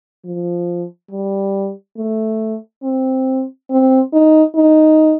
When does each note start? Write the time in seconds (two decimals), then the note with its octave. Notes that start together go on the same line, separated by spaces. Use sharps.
0.25 F3
1.11 G3
1.97 A3
2.83 C4
3.70 C4
4.13 D#4
4.55 D#4